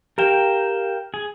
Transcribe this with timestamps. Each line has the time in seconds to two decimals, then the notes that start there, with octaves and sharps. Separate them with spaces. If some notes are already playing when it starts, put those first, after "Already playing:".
0.18 G4 A#4 F5 G5 E7
1.14 G#4